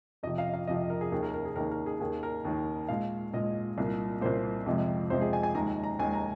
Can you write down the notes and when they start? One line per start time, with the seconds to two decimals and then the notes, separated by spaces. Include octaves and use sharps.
0.23 F2 C3 F3 D#5
0.38 F5
0.54 F5
0.67 F2 C3 F3 D#5
0.90 A#4
1.01 G#4
1.12 D#2 D#3 A#3 G#4
1.23 A#4
1.34 A#4
1.45 G#4
1.56 D#2 D#3 A#3 A#4
1.71 A#4
1.86 G#4
2.01 D#2 D#3 A#3 G#4
2.23 A#4
2.45 D#2 D#3 A#3
2.88 A#2 G#3 F5
3.34 A#2 G#3 D#5
3.78 C2 A#2 A#3
4.21 C2 A#2 A#3 C5
4.66 F2 C3 F3 G#3
5.10 F2 C3 F3 G#3 C5
5.21 G#4
5.33 G#5
5.43 G#5
5.55 D#2 D#3 G#3 A#5
5.84 A#5
5.99 D#2 D#3 G#3 G#5
6.13 A#5